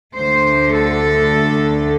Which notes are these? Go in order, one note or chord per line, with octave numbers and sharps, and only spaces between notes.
D2 D3 A3 C5
A4